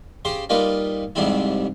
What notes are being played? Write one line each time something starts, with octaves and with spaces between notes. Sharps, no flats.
C#3 G4 C5 C6
G3 A#3 D#4 F4 B4
F2 G#2 C3 G3 C4 E4